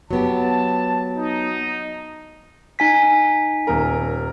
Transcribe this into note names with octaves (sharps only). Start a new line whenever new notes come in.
F#3 B3 G4 A5
D#4
D#4 G#5 B6
D#1 A#4